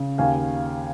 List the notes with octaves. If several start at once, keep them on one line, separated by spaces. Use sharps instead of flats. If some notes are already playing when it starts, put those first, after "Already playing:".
Already playing: C#3
D#2 F5 G#5